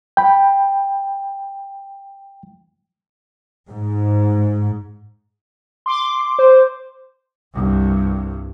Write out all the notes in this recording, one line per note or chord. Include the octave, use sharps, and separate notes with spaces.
G5 B5
G#2
C6 D6
C5
C2 G2